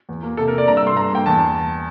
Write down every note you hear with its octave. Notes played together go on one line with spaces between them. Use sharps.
E2
A#3
C3 A4
A#4
C3
D5
G2 A#5
E6
A3
C6
G2 A#5
A#3 G5
E2 A5